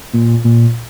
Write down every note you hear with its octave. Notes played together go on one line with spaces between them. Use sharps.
A#2
A#2